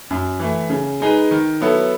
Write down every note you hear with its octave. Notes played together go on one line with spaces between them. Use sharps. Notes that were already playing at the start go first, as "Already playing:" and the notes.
F#2
E3 A3
C#3
G#3 D#4 G#4 B4
D#3
F#3 B3 E4 A4